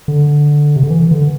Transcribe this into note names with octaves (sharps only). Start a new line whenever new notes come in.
D3
C3
D3
E3
D3